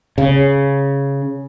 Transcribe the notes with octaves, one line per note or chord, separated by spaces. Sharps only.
C#3